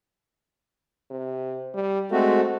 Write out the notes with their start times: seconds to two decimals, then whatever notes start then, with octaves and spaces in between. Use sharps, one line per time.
1.10 C3
1.74 G3
2.12 G#3 A3 C4 F#4